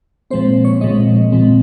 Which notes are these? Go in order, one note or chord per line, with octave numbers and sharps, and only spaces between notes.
A#2 F3 G#3 C4 C5
C#5
A#2 F3 G#3 C4 D#5
A#2 F3 G#3 C4